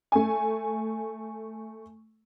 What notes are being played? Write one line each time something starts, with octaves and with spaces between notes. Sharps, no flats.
A3 G#5